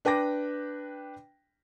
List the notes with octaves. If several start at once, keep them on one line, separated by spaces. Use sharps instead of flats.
D4 B4 G5 D6 A#6